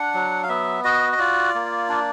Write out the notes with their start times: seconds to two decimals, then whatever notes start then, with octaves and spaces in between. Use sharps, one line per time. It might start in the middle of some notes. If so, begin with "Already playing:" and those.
Already playing: D4 F#5
0.14 F#3
0.44 F5
0.49 B3 E5
0.84 F#4 D#5
1.13 D#5
1.19 F4 D5
1.55 A#3
1.89 D4